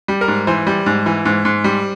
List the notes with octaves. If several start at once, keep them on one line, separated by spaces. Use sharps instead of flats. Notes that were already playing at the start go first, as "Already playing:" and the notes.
G3
A#4
G#2
E3 C5
G3
G#2
E3
G#2
G#2
G3